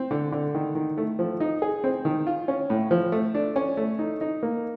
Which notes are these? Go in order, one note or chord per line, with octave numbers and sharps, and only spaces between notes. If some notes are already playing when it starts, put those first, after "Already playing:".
Already playing: C4
D3
D3
D#3
D#3
A3
F3
D#4
G#4
C4
D#3
F4
C#4
A2
F3
A3
D4
C#4
A3
D#4
D#4
A#3